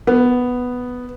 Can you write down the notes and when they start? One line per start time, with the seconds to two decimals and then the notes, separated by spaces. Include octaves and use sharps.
0.07 B3